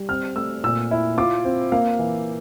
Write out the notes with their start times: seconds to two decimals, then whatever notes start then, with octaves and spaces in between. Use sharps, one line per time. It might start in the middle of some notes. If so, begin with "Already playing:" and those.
Already playing: G3
0.09 C4 F6
0.36 A3 E6
0.64 A#2 E6
0.91 E4
1.18 F4 D6
1.44 C4
1.72 A#3 F5
1.99 E3